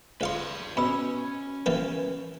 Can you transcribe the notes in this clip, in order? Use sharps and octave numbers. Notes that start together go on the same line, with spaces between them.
C#2 B4 D5 F5 C6
B2 C#4 B5 E6
E3 G3 A#3 B4